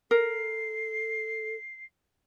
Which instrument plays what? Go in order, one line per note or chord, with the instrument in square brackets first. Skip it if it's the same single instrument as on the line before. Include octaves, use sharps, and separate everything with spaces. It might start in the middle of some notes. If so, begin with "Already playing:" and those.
[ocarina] A4 [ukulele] A#4 [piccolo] C7